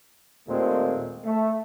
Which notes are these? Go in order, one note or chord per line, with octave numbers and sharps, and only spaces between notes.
D#2 A#2 G#3 A3 C4
A3